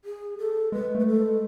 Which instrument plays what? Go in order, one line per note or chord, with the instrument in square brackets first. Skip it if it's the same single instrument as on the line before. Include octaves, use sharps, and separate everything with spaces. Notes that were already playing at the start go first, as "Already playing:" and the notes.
[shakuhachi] G#4
A4
[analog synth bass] G#3 [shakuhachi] B4
[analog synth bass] A3 [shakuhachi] B4
[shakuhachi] A4
[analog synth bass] G#3